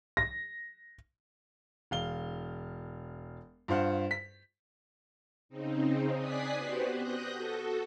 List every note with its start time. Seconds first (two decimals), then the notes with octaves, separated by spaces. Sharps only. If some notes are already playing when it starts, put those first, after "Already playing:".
0.17 A#6
1.91 E1 F5 G7
3.68 G2 F4 C5 F5 F#5
4.11 B6
5.49 C#3 C4 D#4
6.17 D5 G#5 D#6 F#6 B6 C7
6.56 B3 F#4 G4 B4 C5
6.98 D#6 F#6 G6 A#6
7.33 F#4 A4